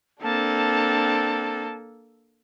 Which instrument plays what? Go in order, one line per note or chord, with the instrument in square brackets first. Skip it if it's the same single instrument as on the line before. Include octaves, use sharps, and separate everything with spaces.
[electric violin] A#3 A4 [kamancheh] C4 D4 [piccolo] A5